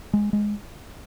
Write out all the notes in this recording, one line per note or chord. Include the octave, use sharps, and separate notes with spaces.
G#3
G#3